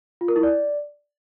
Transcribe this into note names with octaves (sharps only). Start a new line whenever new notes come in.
F4
A#4
E4
D5